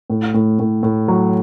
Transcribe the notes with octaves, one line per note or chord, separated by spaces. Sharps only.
A2
A2
A2
A2
F#3